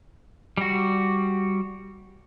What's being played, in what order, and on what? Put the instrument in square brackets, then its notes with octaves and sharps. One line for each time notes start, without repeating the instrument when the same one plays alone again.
[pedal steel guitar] G3 F#4